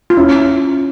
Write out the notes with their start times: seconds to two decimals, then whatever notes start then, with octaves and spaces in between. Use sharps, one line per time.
0.10 F4
0.17 C#4 E4